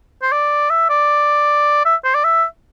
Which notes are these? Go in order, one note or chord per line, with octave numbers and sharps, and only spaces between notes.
C5
D5
E5
D5
E5
C5
D5
E5